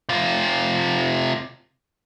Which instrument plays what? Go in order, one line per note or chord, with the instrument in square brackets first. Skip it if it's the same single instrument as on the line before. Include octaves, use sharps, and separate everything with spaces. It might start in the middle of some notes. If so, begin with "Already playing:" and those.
[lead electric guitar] C3 F4